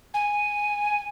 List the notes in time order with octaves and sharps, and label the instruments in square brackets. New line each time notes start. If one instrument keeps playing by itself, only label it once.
[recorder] G#5